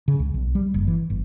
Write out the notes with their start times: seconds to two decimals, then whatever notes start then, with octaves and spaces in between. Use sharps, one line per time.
0.08 C#3
0.19 C#2
0.34 B1
0.55 G3
0.74 F#1
0.88 E3
1.10 G1